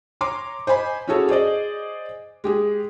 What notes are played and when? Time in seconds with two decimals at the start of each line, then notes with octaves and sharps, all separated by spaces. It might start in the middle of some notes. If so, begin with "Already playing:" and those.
0.21 C#5 A#5 C6 D6
0.67 C5 D#5 G#5 B5
1.08 C#4 E4 F#4 G#4 A4 C#5
1.28 G#4 C5 D5 D#5
2.44 G#3 G4 G#4